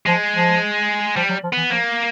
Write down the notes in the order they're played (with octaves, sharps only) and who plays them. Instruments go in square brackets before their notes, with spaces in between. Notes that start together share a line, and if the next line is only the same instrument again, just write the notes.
[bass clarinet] F3 [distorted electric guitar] G#3
[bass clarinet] F3
[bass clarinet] F3 [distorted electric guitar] G3
[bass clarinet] F#3
F3
[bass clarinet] E3 [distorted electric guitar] B3
[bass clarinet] F3 [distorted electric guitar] A#3